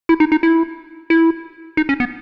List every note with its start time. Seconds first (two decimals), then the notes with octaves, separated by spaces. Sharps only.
0.09 E4
0.20 D#4
0.32 D#4
0.43 E4
1.10 E4
1.77 D#4
1.89 C#4
2.00 B3